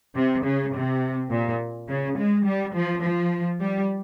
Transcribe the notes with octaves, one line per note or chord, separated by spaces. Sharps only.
C3
C#3
C3
A#2
C#3
G#3
G3
F3
F3
G3